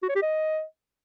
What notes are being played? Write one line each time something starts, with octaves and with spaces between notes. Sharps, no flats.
F#4
C#5
G4
D#5